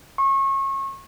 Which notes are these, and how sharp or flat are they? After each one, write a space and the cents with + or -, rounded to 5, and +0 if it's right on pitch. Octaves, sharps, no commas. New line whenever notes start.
C#6 -30